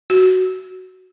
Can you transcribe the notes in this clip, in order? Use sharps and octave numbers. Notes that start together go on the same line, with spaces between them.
F#4